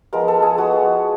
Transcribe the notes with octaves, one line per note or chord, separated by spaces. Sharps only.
F3 G#3 B3 A#4
A4
G#4
F3 G#3 B3 F#4